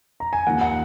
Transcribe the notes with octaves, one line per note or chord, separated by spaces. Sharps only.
A#5
G#5
D#2 D#3 F#5
F#5